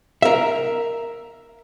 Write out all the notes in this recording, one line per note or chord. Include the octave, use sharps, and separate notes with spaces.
A#4 E5